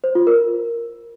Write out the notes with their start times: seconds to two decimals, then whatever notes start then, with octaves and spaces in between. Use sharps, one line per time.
0.04 C5
0.15 F4
0.27 A#4